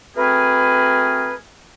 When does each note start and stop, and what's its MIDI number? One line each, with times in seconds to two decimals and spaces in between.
0.16 1.35 57
0.16 1.35 60
0.16 1.35 66
0.16 1.35 68
0.16 1.35 70
0.16 1.35 71